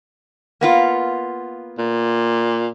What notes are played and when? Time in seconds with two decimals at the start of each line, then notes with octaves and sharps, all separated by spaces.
0.61 A#3 B3 F4
1.78 A#2